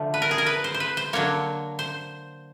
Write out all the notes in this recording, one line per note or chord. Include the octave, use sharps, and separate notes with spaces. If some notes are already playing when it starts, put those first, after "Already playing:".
Already playing: D3 F3 A3
B4
A#4
G#4
A#4
B4
C5
C5
B4
C5
D3 F#3 A#3 C#5
C5